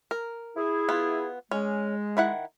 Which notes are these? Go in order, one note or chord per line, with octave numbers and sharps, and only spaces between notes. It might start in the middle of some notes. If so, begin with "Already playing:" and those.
A#4
E4 G#4
B3 F4
G#3 C#4
D#3 E4 F#5